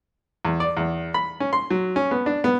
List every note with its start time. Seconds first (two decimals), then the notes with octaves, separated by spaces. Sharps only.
0.45 E2
0.60 D5
0.77 E2
1.14 B5
1.40 C#4
1.53 C6
1.71 F#3
1.96 C#4
2.11 B3
2.26 D4
2.44 B3